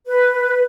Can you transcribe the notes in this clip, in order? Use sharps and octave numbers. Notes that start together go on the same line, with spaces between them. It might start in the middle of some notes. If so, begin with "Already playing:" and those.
B4